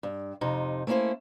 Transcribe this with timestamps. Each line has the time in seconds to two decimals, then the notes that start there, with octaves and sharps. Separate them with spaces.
0.03 G2
0.41 F2 C3 D#4
0.87 A3 A#3 C#4 E4 C5